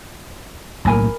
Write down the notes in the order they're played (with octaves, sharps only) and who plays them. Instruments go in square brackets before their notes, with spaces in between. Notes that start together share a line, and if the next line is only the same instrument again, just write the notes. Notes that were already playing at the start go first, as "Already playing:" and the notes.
[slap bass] B1 A2 A#3 [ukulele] A#4 G#5 B5